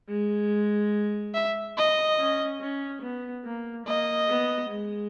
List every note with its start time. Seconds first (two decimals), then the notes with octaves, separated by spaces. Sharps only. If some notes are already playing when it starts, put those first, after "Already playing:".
0.08 G#3
1.34 E5
1.77 D#5
2.19 C#4
2.61 C#4
3.02 B3
3.45 A#3
3.86 A#3 D#5
4.28 B3
4.70 G#3